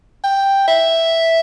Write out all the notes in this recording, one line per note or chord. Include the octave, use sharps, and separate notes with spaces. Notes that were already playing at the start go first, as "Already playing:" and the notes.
G5
E5